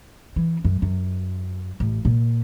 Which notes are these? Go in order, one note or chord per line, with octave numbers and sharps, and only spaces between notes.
E3
F#2
F#2
A1
A#2